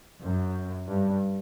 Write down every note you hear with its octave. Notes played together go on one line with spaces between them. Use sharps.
F#2
G2